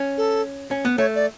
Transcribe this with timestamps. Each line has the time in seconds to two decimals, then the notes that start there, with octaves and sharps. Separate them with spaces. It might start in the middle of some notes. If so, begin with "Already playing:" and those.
Already playing: C#4
0.18 A4
0.71 C#4
0.85 B3
0.98 A3 C#5
1.15 D5